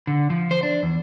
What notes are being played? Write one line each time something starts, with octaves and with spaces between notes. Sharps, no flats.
D3
F3
C5
D4
E2